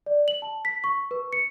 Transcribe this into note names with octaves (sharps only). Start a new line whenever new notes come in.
D5
F#7
A5
B6
C#6
B4
C#7